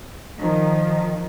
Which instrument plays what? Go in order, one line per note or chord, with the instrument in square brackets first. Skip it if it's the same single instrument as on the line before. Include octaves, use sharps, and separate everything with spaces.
[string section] D#3 F3